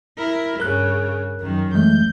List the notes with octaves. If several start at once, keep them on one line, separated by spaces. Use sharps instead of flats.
E4 A#4
G2 C#3 A#4 F#6
F#2 D#3
E3 G#3 A3 G6